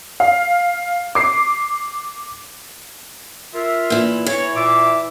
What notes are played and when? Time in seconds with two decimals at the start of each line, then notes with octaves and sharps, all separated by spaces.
0.20 F5
1.15 D6 C7
3.54 F4 A#4 E5
3.90 A#2 E3
4.26 E3 C#5
4.56 A#2 E5 D6